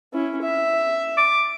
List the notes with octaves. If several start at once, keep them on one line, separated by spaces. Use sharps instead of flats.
C#4 E4
E5
D6